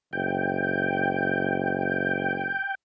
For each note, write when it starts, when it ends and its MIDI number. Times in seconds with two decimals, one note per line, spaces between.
0.13 2.53 30
0.13 2.75 79